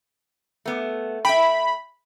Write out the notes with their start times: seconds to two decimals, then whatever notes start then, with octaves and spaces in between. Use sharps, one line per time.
0.65 A3 B3
1.25 E5 G5 B5